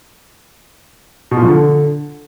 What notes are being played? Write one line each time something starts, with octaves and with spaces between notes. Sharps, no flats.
B2
A#2
F3
D3